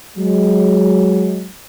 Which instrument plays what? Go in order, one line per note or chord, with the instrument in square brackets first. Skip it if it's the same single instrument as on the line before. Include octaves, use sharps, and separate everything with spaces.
[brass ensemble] F#3 G#3